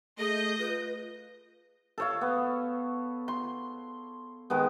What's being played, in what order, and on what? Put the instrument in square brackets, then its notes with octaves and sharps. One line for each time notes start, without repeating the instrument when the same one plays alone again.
[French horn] A3 [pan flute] G#4 [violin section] D#5 G6 [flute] A#6
[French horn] F4 [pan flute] B4
[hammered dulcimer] A4 C#5 F5
B3
C6
D#3 G#3 B3